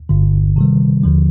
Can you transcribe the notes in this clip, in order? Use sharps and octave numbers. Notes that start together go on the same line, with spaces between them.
G1 G2 D3
C3 D#3 G3
D#2 D3 F3